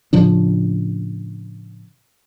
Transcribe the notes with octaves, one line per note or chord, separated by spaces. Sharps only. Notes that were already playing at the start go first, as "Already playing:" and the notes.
A2 C#3 F3 D4